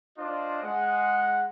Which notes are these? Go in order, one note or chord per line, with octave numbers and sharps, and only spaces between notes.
D4 F4 C5 D#5
G#3 F#5